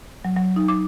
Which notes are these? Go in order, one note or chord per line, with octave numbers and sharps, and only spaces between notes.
F#3
F#3
D#4
D6